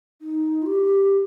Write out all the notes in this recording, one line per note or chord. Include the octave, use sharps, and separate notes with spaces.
D#4
F4
G4